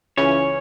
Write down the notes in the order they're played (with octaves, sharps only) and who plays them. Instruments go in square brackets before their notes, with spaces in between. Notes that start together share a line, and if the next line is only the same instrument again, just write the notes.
[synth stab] C#2 C#3 E3 C#4 [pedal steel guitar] C#5